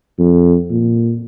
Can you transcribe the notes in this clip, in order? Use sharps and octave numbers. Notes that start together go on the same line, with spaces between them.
F2
A#2